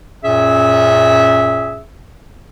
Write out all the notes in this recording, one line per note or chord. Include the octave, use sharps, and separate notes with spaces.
F#2 A#2 C#4 G#4 E5